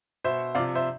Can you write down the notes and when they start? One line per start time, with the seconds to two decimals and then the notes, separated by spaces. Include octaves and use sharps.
0.24 B2 C5 E5
0.55 C3 D5 F5
0.58 F3
0.75 C5 E5